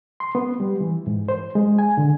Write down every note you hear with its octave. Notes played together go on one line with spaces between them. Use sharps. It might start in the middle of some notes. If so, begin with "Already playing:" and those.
C6
B3
G3
E3
G#2
C5
G#3
G#5
D3